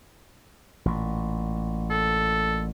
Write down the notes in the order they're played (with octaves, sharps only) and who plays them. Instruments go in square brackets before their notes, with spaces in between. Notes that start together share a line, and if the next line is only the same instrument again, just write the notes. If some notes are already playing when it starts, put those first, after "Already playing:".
[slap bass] A1 A#2
[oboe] A4